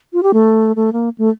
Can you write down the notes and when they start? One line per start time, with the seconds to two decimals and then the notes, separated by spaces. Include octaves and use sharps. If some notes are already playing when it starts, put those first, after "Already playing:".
0.13 F4
0.23 G4
0.34 A3
0.76 A3
0.93 A#3
1.18 A3